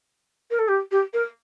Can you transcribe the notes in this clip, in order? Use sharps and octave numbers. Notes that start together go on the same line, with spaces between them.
A#4
A4
G4
G4
A#4